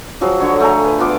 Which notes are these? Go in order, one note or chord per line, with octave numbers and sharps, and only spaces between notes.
F3 F#3 G#4
D3 C#5
A3 G#4 G#5 A#5
B4
B3 F4 D6